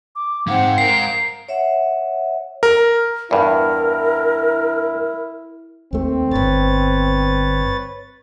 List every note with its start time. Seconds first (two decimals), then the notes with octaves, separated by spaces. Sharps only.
0.15 D6
0.47 G#3 C4 D#4 F5 F#5
0.78 G#3 A#4 F#5 C7
1.48 C#5 E5 F#5
2.63 A#4
3.31 E2 G2 E4 A#4
5.93 D#2 A3 C4
6.31 D1 G1 B4 C#5 A6